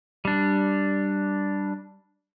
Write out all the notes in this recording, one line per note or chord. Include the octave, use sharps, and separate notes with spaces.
G3 D4